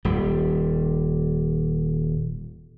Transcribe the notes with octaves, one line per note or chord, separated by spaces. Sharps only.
D#1 G3